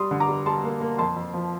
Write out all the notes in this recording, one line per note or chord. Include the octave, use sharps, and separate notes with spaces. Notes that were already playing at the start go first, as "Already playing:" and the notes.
Already playing: G3 C6 D#6
D3
A#5 D6
G3
G3 A5 C6
A#3
A#3
F2 A5 C6
F2
F3